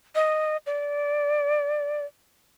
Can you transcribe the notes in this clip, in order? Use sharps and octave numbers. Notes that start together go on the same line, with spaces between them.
D#5
D5